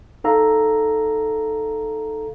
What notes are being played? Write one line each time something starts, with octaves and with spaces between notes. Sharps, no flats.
D#4 A4 F5 A#5